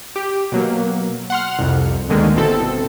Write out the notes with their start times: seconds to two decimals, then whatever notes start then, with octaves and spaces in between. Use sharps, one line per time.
0.16 G4
0.52 B2 F#3 A#3
1.30 F#5 C6 F6
1.59 C2 F2
2.09 D2 B2 D3 D#3 G#3 A#3
2.36 G1 B2 C4 E4 A4